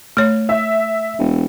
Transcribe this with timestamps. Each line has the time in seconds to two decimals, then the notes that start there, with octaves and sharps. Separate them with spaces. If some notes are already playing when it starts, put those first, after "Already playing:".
0.17 A3 C#5
0.49 E5
1.19 E1